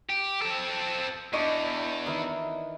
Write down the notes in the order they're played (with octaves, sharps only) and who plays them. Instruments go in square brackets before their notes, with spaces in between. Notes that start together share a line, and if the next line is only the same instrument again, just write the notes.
[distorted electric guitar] G4
C4 A4
[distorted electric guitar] E2 [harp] D4 D#5 C#6
[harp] D#3 E3